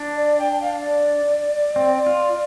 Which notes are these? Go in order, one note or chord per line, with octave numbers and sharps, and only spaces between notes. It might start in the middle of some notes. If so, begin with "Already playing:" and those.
Already playing: D4
D5
G5
F5
D5
C4
F4